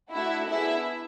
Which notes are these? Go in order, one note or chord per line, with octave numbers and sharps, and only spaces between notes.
A3 D4 E4 F#4 E5
B3 D4 E4 G#4 E5